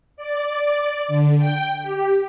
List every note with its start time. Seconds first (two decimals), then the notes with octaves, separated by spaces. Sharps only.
0.17 D5
1.08 D3
1.38 G5
1.82 G4